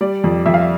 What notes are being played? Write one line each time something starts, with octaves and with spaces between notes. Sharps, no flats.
G3 D5
F2
F2 E5
F5
E5